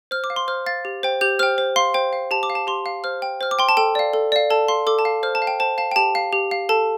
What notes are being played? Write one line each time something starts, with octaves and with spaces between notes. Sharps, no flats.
C5 F6
D6
F5
C6
C5 F6
F5 A6
G4
C5 G5
G4 G6
C5 G5 F6
C5
F5 C6
C5 G5
F5
G4 A5
D6
F5
A5
G4 C6
F5
C5 F6
G5
C5 F6
D6
G5 C6
A5
A4 G5
D5 F5
A4
D5 F5
A4 A5
F5 C6
A4 D6
A5
F5
C5 F6
A5
F5
G5
C5 A5
F5 A5
G5
G4 A5
F5
G4
F5
A4 A5